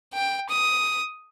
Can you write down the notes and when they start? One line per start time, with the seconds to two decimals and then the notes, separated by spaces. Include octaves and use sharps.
0.14 G5
0.49 D#6